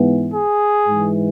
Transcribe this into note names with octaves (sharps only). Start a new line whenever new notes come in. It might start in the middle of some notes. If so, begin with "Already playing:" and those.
Already playing: G#2 E3 B3
G#4
G#2 E3 G#3